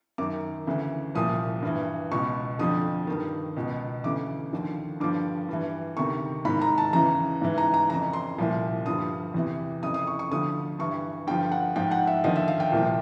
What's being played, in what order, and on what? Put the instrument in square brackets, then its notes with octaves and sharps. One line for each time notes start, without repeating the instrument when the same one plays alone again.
[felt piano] F#2 D#3 D6
D2 C#3 E3
C2 A#2 F3 D#6
G2 E3
C#2 B2 C#6
F2 D3 F3 D#6
G2 D#3
C#2 B2
D2 C#3 E3 D6
D#2 D3 F3
G2 D3 F3 D6
G2 E3
D2 C3 D#3 C#6
G#2 D#3 B5
A#5
A5
E2 C#3 E3 A#5
G#2 E3
A#5
A#5
F2 C#3 E3 A#5
C6
C2 A#2 F3
G2 D3 F3 D#6
E2 C3 E3
F2 C#3 E3 D#6
D#6
C#6
C#6
D2 D3 F3 D#6
G2 E3 C#6
G2 D3 F3 G5
F#5
G#2 F3 G5
F#5
E5
D#2 D3 F3 D#5
E5
F5
G5
C2 A#2 F3